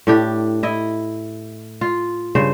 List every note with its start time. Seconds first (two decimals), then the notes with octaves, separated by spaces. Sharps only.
0.07 A2 D4 G4
0.63 E4 D#5
1.81 F4
2.35 G2 C#3 C5